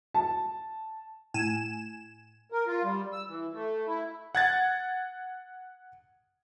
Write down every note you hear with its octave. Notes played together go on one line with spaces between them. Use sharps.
A5
A2 G#5 E7
A#4
F4
G3
E6
E3
A3
E4
F#5 G#6 A6